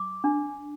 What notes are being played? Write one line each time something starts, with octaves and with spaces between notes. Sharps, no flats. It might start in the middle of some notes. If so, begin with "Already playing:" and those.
Already playing: D6
D4